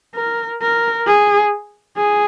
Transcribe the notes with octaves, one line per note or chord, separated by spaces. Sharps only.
A#4
A#4
G#4
G#4